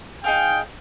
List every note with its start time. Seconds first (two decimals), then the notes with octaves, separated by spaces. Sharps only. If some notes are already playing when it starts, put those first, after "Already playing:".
0.24 D#4 G#4 F5 G5